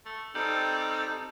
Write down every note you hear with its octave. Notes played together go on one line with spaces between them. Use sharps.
A3
G3 C4 D#4 A4